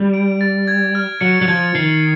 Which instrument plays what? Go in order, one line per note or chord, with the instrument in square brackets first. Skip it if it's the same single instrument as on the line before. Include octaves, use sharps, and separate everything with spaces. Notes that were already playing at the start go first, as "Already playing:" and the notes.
Already playing: [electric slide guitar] G3
[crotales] D7
A6
G#6
F6
[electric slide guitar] F#3 [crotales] C#7
[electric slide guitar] F#3
[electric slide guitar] F3 [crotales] G#6
[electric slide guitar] D#3 [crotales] C7